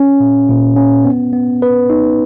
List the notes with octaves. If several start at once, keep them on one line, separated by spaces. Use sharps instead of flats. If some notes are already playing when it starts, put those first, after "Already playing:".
Already playing: C#4
A#2
A#2
C#4
B3
B3
B4
D#4